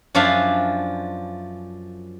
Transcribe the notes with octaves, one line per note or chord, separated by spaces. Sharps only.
F#2 F3 D4 E5 F5 G#5